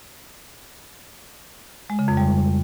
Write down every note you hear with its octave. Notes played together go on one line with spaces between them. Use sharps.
G#3
C#3
F2
G3